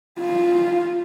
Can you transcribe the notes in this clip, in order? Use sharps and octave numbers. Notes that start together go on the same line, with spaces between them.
F4